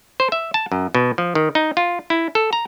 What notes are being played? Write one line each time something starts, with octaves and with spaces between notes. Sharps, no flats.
C5
E5
A5
F#2
B2
F3
D#3
D#4
F4
E4
A4
A#5